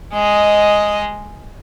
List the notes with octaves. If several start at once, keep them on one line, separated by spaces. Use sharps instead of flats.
G#3 D#5